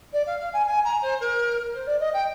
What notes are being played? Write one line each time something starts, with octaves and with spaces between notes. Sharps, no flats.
D5
F5
F5
G#5
G#5
A#5
C5
A#4
C5
D5
D#5
G5